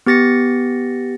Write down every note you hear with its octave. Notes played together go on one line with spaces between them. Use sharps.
B3 G4 A6 A#6 C#7